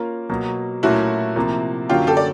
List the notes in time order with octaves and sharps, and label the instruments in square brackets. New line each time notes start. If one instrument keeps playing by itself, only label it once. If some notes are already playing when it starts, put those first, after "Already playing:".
Already playing: [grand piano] A#3 C#4 F4 A#4
B2 F#3 A#3
[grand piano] A#2 F#3 A3 C#4 [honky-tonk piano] E4 F#4
[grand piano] C3 F3 A#3
[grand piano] F#2 D3 F#3 A#3 C#4 [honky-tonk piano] F4 G4
[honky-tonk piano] G4 A4
D5